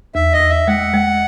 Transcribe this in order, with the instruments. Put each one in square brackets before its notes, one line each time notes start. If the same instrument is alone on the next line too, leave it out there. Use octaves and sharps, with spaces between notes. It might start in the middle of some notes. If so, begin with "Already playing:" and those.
[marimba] E2 [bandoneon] E5
[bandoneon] D#5
[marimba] E2
[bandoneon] E5
[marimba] G#3 [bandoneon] F#5
[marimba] G#3